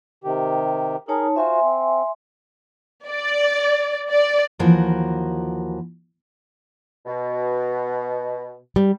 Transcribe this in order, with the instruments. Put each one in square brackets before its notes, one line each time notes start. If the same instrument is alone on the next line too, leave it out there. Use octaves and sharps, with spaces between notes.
[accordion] C3 D#3 G4
[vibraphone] D#4 C#5 A5 [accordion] G#4 A#4
[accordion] F4 F#4 C5 [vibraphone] E5 G#5 C6
[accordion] C4
[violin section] D5
D5
[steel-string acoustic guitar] D#2 E3 F3 F#4 A#4
[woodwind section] B2
[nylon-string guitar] G3